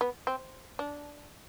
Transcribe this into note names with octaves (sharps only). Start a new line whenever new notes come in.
B3
C4
D4